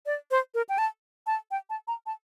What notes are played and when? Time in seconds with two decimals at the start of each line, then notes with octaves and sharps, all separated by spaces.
0.06 D5
0.31 C5
0.55 A#4
0.69 G5
0.78 A5
1.27 A5
1.51 G5
1.70 A5
1.88 A#5
2.06 A5